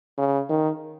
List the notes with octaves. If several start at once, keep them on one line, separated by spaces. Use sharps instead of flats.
C#3
D#3